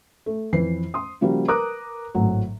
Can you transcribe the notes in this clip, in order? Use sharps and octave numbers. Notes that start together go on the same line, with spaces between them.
A3
F2 E3 B4 C7
C6 D#6
C#3 F3 G3 A#3 F#4
A#4 B4 A#5 D6 D#6 F#6
G#1 A2 F#3